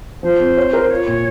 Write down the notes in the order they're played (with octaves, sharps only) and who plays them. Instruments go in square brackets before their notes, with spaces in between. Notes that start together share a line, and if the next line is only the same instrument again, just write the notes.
[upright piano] F3 [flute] C5
[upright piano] C4
C#5
A#4
[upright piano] F4 [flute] C#5
[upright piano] A#2